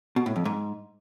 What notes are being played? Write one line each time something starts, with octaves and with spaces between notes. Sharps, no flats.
B2
A2
F2
G#2